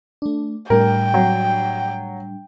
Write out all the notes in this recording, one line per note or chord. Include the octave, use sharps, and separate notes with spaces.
A3 D4
A2 G3 D4 A#4 G5
F#3